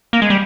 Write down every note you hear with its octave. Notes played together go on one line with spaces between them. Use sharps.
A#3
G#3
G3